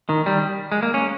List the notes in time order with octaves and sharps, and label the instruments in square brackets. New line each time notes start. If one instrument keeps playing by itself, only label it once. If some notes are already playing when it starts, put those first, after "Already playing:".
[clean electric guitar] D#3
G3
G#3
A#3
C#4